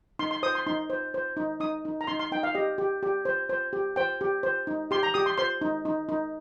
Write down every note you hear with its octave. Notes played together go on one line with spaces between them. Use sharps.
D#4 C6
C6
C5 D#6
C6
D#4 C6
C5
C5
D#4
D#4 D#6
D#4
A#5
D#4 C6
C6
D#4 G5
F5
G4 D#5
G4
G4
C5
C5
G4
C5 G5
G4
C5
D#4
G4 C6
A#5
G4 D#6
C6
C5 C6
D#4
D#4
D#4